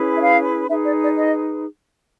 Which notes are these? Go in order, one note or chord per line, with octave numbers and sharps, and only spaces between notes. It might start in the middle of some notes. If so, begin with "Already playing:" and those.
Already playing: C#4 E4 G#4 B4
E5
F5
D#4 G#4 B4 E5
D5
D5
D#5